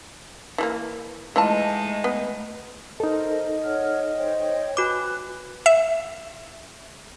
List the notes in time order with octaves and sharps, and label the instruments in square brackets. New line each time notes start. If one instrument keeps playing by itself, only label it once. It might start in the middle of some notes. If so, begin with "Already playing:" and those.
[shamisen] E3 A3 A#3
[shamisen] E3 F4 A5 [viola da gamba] G#3 A3 D#4
[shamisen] B3
[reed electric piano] D#4 A4 [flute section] A#4 C5 [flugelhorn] D#5
[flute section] C#5 F#5 F6
C5 C#5 G5
[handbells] F#4 D6 [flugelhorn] B4 [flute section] G#5 F#6
[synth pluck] E5